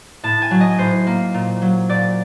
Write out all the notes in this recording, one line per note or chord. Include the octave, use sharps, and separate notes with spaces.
A2 A5
G#5
F#3
D#5
A2 C5
A#3
A#2
F#3
A#2 D5